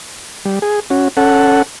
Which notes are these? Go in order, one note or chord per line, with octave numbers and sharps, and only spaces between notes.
G3
G#4
C#4 F#4
C#4 A4 F#5